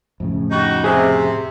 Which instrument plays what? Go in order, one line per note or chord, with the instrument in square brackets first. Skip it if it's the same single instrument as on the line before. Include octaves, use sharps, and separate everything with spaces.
[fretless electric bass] F2 A2 C#3
[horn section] G3 D#4 F#4
[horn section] C3 [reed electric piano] G#4 E5